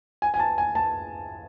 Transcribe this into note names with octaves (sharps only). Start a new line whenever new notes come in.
G#5
G#5
A5
G#5
A5